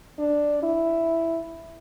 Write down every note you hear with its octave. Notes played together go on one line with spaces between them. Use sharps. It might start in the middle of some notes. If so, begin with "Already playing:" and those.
D4
E4